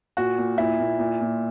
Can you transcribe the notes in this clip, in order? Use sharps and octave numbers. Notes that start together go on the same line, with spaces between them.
A#2 F#4
A#2
A#2 E4
A#2
A#2
A#2